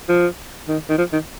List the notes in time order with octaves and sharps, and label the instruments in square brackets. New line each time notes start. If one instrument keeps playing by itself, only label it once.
[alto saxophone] F3
D#3
D#3
F3
D#3